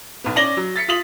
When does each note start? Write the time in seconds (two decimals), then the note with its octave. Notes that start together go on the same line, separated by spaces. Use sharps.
0.24 B1 B3
0.36 C#4 D5 A#6 F#7 G7
0.57 F#3
0.76 A6 B6 C#7
0.88 F4 D#6 B6 F#7